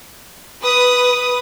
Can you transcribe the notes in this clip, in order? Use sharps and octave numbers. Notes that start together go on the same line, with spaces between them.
B4 D#6